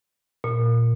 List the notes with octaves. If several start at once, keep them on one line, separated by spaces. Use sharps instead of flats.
A#2